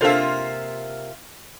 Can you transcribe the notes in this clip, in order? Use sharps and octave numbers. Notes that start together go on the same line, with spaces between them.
C3 A#3 D4 F4 A4 C5 E5